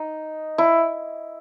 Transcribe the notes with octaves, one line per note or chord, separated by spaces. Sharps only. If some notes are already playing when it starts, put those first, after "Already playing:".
Already playing: D#4
E4